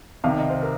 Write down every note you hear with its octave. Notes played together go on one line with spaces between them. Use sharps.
C2 C3 D#3 F5
D#5
C5
A#4